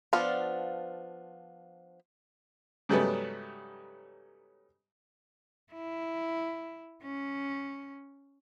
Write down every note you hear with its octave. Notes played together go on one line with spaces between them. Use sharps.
F3 B3 D4 F4
G#2 C#3 F#3 G3 A3 B3
E4
C#4